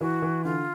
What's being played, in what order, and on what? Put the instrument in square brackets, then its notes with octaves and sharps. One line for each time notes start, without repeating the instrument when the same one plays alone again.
[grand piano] E3 [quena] F#4
[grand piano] E3
[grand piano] D3 [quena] F4